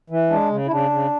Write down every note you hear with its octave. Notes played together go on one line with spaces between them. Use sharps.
E3
G#3 D4
C#3
E4
C#3 D4
C#3